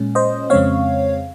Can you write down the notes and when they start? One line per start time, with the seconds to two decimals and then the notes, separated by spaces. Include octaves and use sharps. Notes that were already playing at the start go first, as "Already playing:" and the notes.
Already playing: A#2 G#3 C#4
0.15 C5 D#5
0.50 F2 C#3 G#3 C4 C#5 F5